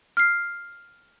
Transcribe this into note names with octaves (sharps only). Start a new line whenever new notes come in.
F6 C7